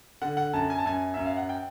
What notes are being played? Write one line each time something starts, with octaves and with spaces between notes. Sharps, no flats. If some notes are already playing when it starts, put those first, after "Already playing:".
D3 F#5
F#5
F#2 A5
G#5
A5
F#2 G#5
F#2 E5
F5
F#5
G5